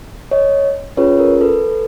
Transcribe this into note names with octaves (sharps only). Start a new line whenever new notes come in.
C#5 D#5
C#4 F4 G#4 B4 C#5
A#4
A4 B4